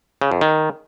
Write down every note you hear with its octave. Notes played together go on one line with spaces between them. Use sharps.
C#3
F2
D#3